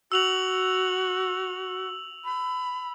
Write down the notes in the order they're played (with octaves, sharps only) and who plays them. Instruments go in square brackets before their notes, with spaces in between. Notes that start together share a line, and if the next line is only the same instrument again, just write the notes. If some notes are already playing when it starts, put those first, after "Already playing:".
[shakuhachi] F#4 [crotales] E6 F7 F#7
[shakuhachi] B5